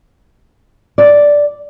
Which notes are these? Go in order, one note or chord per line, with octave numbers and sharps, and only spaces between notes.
D5